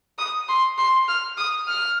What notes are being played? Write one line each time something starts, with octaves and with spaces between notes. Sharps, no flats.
D#6
C6
C6
F6
D#6
F6